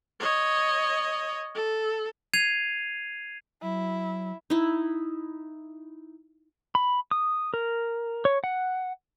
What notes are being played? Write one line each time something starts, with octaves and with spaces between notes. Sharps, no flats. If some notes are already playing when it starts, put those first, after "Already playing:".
C#5 D#5
A4
G#6 C7 D#7 F7
F#3 E4
D#4 E4
B5
D#6
A#4
C#5
F#5